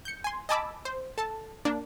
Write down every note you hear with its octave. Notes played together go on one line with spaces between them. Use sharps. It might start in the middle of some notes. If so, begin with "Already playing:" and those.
G6 C#7
G#5 C6
D#5 G#5 A5 B5 D6 E6
C5
A4 A5
A#3 D4